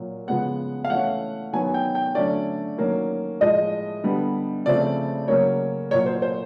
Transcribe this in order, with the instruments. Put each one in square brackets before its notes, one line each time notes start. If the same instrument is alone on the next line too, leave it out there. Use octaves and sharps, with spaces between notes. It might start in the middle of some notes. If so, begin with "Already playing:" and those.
Already playing: [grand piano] A#2 F#3 A#3
C#3 F3 G#3 B3 F#5
F5
E3 A3 C#4 F#5
D#3 F#3 B3 G#5
G5
G5
D3 F#3 A3 C#4 D5
D#3 F#3 A#3 C#4
A2 F3 G#3 D#5
D3 G3 B3
C#3 F3 A3 C4 D5
C#3 F#3 A#3 C#4 C#5
A#2 F#3 A#3 C#5
C5
C5